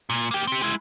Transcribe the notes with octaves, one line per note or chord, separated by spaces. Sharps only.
A#2
A#3 G5
C4 G4
G#3 E4